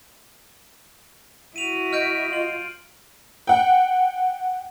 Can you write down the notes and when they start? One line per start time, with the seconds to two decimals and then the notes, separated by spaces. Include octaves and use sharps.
1.56 E4 F#4 D#7 F7
1.93 D#5 F6 G6 D7
2.33 F4 F#7
3.47 F#5 G5